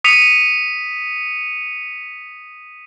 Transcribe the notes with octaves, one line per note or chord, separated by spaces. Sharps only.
D#6 B6 C#7 D#7 F7